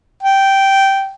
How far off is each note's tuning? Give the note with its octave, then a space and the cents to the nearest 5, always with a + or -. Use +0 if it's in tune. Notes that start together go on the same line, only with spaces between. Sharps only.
G5 -10